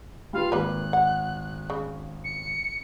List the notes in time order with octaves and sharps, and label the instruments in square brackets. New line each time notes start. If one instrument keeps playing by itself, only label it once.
[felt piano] G3 F4 B4 [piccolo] F5
[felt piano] G#1 [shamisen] A#3 B4 [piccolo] F#6
[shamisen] F#5
C#3
[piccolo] C#7